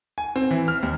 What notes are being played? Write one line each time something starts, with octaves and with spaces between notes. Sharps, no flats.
G#5
C4
E3
F6
D#2